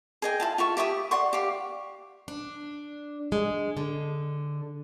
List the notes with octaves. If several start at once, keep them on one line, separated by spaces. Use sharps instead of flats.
G#4 D#5 G5
E4 F4 A5
F4 E5 C#6
G4 E5 B5 D#6
D5 F#5 C6 C#6
G4 F5
D4
G#3
D3